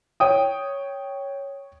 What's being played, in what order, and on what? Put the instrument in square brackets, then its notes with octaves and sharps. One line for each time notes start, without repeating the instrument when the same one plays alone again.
[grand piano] C#5 G5 D#6